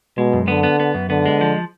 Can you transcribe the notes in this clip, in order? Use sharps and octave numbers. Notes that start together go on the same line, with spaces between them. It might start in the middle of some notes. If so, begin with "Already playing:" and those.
B2 G#3
F#2
D3 B3
B3
B3
F#2
D3 B3
G#3
F3